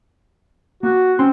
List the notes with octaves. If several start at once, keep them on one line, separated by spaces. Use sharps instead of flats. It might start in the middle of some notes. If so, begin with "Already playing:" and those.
A#3 F#4
C4 C#4 C6